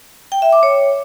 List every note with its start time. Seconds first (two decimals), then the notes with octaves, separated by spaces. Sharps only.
0.32 G5
0.42 E5
0.52 D6
0.63 C#5